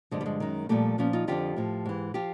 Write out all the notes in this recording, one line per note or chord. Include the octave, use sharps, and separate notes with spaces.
G2 D3 F3 G#3
G3
G#3
F#2 D#3
A#2 F3 G3 A3
A#2 F3 B3 C#4
D#4 F4
F2 D3 F3 F4 G4
A2 F3
G#2 E3
F3 F4 G4